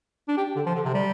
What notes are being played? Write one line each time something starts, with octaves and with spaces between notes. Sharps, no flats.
D4
G4
D3
F3
D3
C3
G3